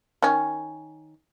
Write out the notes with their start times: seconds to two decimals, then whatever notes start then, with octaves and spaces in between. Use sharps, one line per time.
0.22 D#3 C#4